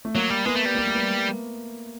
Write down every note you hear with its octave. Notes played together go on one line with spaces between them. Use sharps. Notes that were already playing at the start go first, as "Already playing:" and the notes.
A3
F#3 A#3
G3
G#3 B3
A3
G3
A#3
A3
B3